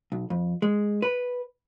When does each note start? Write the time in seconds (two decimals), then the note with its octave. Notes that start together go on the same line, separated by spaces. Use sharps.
0.12 B1
0.30 F2
0.62 G#3
1.02 B4